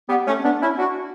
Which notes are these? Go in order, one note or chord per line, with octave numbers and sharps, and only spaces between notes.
G3 B3
A3 C#4
B3 D4
C#4 E4
D4 F#4